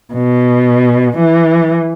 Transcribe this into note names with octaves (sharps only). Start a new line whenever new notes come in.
B2
E3